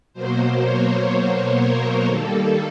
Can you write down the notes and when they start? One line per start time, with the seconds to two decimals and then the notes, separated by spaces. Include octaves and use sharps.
0.13 B2 F#3 A#3 C5
0.62 C#5
1.10 C5
1.58 A#4
2.05 D#3 G3 A#3 A4